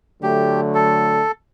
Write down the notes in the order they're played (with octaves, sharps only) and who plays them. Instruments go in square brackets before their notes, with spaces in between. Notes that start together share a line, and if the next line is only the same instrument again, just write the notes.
[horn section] D3 F#3 A3 [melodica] G4
[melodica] A4